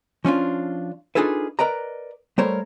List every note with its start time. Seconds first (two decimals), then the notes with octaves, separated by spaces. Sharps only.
0.25 F3 C#4 D4 F4
1.15 D4 D#4 F4 G#4 A4 B4
1.59 A#4 B4 D5 D#5 A#5
2.38 G3 A3 A#4 C5 C#5